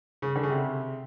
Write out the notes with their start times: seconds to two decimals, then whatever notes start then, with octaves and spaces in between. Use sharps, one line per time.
0.22 C#3
0.36 D3
0.43 C#3
0.50 C3